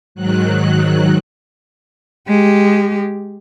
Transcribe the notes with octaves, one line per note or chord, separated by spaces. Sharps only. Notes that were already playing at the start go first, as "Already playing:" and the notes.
G#2 D#3 F#3 F#6
G#3 G4